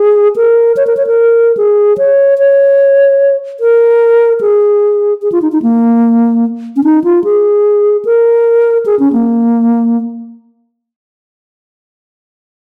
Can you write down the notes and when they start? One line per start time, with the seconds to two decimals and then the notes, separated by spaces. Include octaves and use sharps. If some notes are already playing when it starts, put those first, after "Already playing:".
Already playing: G#4
0.36 A#4
0.77 C#5
0.87 A#4
0.97 C#5
1.07 A#4
1.57 G#4
1.98 C#5
2.38 C#5
3.60 A#4
4.41 G#4
5.22 G#4
5.32 F4
5.42 D#4
5.52 D#4
5.62 A#3
6.76 C#4
6.84 D#4
7.04 F4
7.24 G#4
8.05 A#4
8.86 G#4
8.99 C#4
9.13 A#3